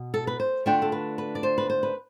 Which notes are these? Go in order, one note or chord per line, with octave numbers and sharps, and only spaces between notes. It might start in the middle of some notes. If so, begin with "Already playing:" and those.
Already playing: B2
A4
B4
C5
D3 A3 D4 F4 G5
A4
B4
B4
D5
C5
B4
C5
B4